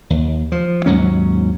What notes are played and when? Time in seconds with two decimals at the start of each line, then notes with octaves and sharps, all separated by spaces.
0.10 D#2
0.52 F3
0.86 D#2 G#2 F#3 C#4